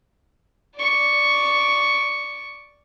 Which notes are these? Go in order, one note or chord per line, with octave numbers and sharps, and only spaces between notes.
D5 C#6